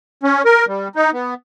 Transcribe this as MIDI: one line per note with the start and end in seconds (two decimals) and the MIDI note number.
0.23 0.42 61
0.45 0.66 70
0.68 0.88 55
0.96 1.11 63
1.13 1.34 59